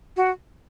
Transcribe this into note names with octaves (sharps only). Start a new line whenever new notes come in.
F#4